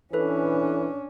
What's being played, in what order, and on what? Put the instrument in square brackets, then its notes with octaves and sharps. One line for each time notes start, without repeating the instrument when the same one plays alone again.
[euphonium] E3 [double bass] C#4 D4 [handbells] A4 B4